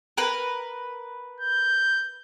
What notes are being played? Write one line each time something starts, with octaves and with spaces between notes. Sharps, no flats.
A#4 B4
G6